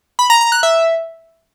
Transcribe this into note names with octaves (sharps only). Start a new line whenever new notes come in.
B5
A#5
A#5
F#6
E5